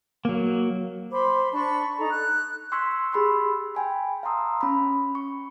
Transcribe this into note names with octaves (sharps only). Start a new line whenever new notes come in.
F#3 A#3
C5 B5 C6 D6
D4 A5 B5 C#6
D#4 A4 A#5
F#6
C6 C#6 E6 F#6 G#6 B6
G4 G#4 B5 C6 E6
G5 G#5 B5
F5 A5 A#5 C6 D#6 E6
C#4 B5
C#6